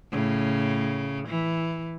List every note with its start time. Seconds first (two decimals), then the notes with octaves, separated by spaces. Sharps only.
0.12 A2 C#3
1.28 E3